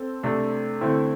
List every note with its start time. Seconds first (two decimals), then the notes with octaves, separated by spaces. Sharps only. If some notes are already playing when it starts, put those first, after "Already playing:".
Already playing: C4 A4
0.23 C3 A3 D4
0.81 D3 A3 C4 E4